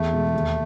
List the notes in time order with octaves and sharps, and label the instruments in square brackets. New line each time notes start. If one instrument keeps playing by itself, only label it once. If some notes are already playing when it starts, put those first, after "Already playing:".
Already playing: [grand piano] E2 [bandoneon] A3
[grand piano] B2 G#3
D#2